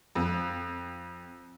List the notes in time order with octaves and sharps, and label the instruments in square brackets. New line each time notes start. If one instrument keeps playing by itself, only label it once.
[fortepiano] F2